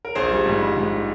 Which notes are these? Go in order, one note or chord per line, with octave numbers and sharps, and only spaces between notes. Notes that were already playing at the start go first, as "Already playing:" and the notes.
A#4
A#1 G#4 C5
G3
G#2
G3
G#2